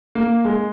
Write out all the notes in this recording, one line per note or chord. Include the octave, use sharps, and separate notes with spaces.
A#3
G#3